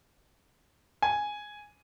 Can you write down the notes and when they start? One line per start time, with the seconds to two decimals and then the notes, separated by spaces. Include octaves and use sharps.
1.02 G#5